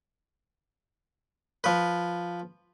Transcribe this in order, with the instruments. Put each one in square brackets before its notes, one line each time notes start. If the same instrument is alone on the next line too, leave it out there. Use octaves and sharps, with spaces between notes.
[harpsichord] F3 B4